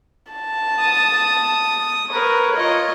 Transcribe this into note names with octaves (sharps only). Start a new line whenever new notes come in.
A5
D#6
A#4 B4 C#5
F4 D#5